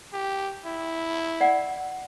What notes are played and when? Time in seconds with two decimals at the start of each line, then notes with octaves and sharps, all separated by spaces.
0.13 G4
0.66 E4
1.40 D5 F#5